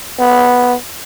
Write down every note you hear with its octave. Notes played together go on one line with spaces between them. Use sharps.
B3